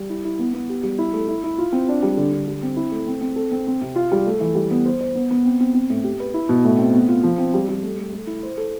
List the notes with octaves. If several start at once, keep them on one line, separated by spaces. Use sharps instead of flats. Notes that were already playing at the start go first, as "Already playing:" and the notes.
Already playing: G3
E4
E4
B3
B3
G4
G3
E4
A3
E4
E4
F4
C4
D4
G3
D3
D3
G3
C4
E4
A3
C4
C4
A4
C4
C4
C3
F4
G3
A3
E3
G3
B3
C5
C5
B3
B3
C4
C4
C4
A2
G4
B4
E4
B2
A2
C4
B3
F4
F3
C4
G3
G3
A3
A3
A3
E4
C5
A4